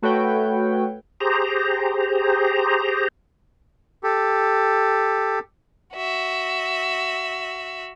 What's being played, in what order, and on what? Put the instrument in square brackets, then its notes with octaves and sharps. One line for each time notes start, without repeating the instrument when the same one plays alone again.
[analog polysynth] A3 F#4 A4 B4 C#5 G5
[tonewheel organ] G4 G#4 C5 A#5
[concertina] G4 A4
[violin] F#4 E5